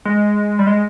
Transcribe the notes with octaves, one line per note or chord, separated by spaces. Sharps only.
G#3
G3
G#3